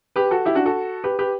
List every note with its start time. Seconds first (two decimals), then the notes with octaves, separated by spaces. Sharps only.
0.16 G4 B4
0.31 F#4 A4
0.46 E4 G4
0.55 D4 F#4
0.66 F#4 A4
1.04 G4 B4
1.19 G4 B4